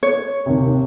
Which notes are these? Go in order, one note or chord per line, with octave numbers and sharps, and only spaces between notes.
C#5
D#2 C3